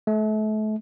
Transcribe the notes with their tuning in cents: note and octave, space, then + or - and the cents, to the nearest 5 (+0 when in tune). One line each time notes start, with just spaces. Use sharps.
A3 -35